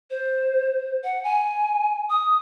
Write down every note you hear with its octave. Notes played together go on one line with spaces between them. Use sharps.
C5
F#5
G#5
D#6